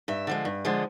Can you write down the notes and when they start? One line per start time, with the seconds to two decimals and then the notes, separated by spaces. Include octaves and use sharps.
0.08 G2 E5
0.27 D3 F3 G#3
0.45 G2
0.65 D3 F3 G#3